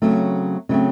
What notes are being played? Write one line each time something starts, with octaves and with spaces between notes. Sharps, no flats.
C#3 F#3 A3 C4
C#3 F#3 A3 C4